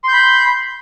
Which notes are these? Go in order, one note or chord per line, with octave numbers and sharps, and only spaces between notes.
B5 C6 G6